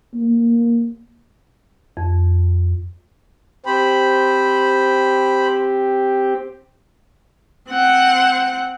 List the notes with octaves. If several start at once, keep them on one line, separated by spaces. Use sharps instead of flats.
A#3
F2
C4 G4 C5 B5
C4 F#5